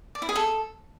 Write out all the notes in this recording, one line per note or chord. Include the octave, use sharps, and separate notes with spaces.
D5
E4
G#4
A4